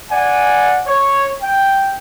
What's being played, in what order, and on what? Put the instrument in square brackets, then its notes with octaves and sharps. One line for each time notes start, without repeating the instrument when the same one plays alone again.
[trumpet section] D5 F#5 G#5
C#5
G5